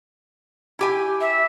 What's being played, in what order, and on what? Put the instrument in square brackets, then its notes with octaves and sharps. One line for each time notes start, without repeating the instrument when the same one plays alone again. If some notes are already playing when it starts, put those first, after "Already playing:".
[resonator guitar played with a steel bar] E4 G4 G#5
[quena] E5